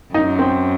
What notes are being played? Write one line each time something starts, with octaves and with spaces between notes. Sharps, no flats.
F#2 D#4
C4